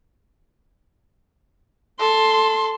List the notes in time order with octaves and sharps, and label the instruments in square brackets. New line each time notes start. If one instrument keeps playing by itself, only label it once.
[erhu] A4 [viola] C6